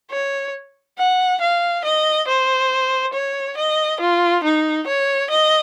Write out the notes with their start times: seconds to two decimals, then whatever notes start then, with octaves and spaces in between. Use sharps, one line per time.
0.11 C#5
0.98 F#5
1.41 F5
1.85 D#5
2.28 C5
3.13 C#5
3.57 D#5
4.00 F4
4.44 D#4
4.87 C#5
5.30 D#5